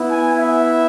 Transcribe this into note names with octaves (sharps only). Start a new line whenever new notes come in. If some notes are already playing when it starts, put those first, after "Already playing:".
Already playing: B3 E4
G#5
E5